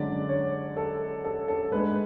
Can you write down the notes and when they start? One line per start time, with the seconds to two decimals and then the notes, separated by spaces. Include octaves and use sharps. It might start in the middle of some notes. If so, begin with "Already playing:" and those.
Already playing: F#2 D3 G#3 D5
0.29 C#5
0.77 A4
1.24 A4
1.48 A4
1.71 G#2 G#3 D4 B4